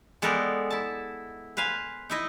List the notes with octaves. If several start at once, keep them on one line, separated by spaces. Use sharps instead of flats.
G#3 B3 A4 A#4 D5 G5
E4 A5
B4 C5 F5 G#5
D#4 E4 D#5